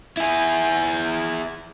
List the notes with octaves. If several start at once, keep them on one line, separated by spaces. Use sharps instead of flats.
E4 G#4